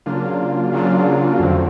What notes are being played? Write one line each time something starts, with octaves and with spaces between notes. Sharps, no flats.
C#3 F#3 A#3 D4 F4
C#3 F#3 A#3 D4 F4
F2 D3 F#3 A3 C4